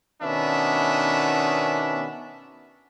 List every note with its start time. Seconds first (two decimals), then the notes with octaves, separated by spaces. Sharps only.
0.21 B2 D#3 B3 C#4 D4 E5